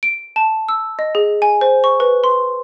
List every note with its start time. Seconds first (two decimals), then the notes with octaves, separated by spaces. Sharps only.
0.03 D7
0.36 A5
0.69 E6
0.99 D#5
1.15 G#4
1.42 G#5
1.61 C5
1.84 C#6
2.00 B4
2.24 C6